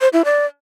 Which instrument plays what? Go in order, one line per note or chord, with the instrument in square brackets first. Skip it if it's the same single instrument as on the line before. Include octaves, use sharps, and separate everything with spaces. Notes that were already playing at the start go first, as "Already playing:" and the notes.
[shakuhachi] C5
E4
D5